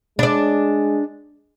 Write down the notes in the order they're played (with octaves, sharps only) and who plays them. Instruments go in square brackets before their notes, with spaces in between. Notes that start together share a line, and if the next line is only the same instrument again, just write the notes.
[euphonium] G#3 [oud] D4 D5